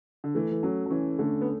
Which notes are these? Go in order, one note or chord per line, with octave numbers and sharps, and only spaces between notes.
D3
E3 A3
E3
F#3 C#4
F#3
E3 C#4
D3 A3
B3